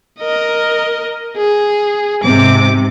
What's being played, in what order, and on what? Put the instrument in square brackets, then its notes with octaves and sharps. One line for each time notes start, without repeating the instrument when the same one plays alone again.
[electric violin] A#4 D#5
G#4
[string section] G#2 C3 [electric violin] D6